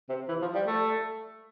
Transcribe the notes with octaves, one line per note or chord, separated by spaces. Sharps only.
C3
E3
F3
G3
A3